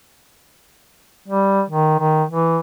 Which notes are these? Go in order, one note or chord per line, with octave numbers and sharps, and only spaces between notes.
G3
D#3
D#3
E3